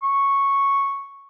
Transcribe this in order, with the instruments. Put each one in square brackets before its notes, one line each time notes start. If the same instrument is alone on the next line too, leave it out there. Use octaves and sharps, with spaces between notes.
[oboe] C#6